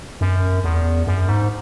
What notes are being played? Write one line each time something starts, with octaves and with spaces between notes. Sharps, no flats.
F#2
E2
F#2
G#2